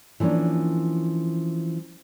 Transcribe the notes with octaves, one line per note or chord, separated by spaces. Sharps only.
E3 F3 A#3 C#4 D4